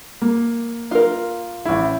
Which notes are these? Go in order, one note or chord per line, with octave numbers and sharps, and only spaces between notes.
A#3
F4 A#4
A1 E4